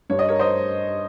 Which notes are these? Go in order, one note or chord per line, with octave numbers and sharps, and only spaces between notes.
G2 C#5
D#5
A#4 C#5
C5 D#5